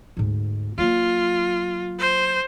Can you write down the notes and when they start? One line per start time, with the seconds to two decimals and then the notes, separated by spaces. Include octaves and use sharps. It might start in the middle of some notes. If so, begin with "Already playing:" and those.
0.17 D2 G#2
0.78 F#3 A#3 F4
1.99 C5